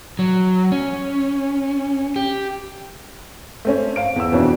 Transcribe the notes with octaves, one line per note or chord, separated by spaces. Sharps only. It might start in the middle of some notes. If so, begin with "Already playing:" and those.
F#3
C#4
G4
A3 C4 C#4
F5 D7
E2 E6
F2 B2 E3 C#4 D4